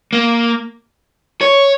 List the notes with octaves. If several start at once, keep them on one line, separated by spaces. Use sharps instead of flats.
A#3
C#5